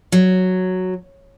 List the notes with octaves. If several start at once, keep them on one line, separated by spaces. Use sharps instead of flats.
F#3